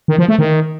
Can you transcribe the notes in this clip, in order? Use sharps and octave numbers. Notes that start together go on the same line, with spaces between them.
D#3
F3
A3
D#3